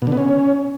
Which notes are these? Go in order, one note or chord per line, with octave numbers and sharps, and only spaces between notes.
B2
D3
B3
C#4